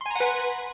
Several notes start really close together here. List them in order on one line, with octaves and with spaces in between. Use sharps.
C6 G#5 A#5 F#5 B4